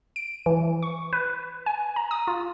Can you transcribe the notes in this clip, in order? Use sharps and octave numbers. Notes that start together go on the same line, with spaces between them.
D7
E3
C#6
B4
G#5
A#5
D#6
F4